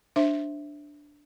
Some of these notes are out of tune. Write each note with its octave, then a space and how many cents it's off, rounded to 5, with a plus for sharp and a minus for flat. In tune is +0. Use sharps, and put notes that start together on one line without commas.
D4 +0 C5 +15 E5 +0